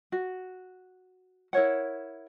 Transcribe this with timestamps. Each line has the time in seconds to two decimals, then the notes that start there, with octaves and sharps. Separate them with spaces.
0.12 F#4
1.53 E4 A#4 C#5 F#5